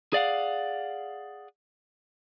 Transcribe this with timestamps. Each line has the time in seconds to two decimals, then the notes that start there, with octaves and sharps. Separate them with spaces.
0.13 G#4 D5 F5 F#5